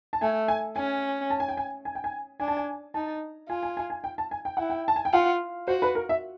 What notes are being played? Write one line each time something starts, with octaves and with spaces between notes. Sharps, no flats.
A5
A3 G#5
G#5
C#4 G#5
A5
G#5
G5
G#5
G#5
G5
G#5
D4 G#5
A5
G#5
D#4 A5
F4 G#5
G#5
G#5
G#5
G5
A5
G#5
G5
E4 F#5
G5
A5
G#5
G5
F4 F#5
F#4 C5
B4
A#4
E5